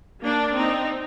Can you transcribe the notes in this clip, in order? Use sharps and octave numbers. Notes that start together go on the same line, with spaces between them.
A#3 D4
C4 D#4